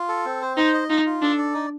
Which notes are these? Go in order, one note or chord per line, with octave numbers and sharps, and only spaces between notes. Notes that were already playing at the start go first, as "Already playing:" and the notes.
Already playing: F4
A4
C4
C5
D#4 C5
D#5
D#4 F4
F4
D4 A4
D5
D#4